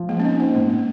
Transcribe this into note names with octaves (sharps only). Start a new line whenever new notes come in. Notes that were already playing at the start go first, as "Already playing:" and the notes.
Already playing: F3
G#3 A#3
C#4
C4 D#4
A#3 C4
G#2 A#3
A#3